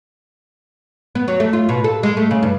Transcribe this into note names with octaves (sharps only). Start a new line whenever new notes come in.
B3
F#3
A3
F4
B2
A4
G#3
A3
C#3
G2